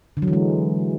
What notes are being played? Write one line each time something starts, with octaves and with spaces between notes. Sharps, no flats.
D3
F#3
E3
G#3